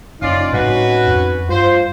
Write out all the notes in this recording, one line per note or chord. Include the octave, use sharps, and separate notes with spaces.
F#1 C#4 D#4 F4 D5
A2 G3 C4 C#4 F#4 B4
F2
G2 F4 C5